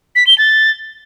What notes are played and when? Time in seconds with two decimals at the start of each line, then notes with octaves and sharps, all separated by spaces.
0.16 B6
0.27 G7
0.38 A6